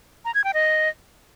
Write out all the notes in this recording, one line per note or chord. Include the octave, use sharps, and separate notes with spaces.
A#5
G#6
G5
D#5